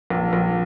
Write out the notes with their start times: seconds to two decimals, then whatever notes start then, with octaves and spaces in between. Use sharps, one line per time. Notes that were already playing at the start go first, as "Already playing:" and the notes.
0.10 A#1
0.33 A#1